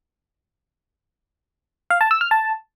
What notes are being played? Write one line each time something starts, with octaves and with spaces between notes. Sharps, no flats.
F5
A5
E6
F6
A5